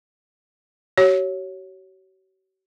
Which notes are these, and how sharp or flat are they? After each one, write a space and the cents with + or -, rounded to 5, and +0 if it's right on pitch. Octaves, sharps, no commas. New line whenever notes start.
F#4 +45 C#5 +0